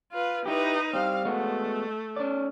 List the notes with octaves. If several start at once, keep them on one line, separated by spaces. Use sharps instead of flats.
F4 B4
D#4 E4 G4 B4
G3 C4 F5
G#3 A3 B3 F#4
C#4 D5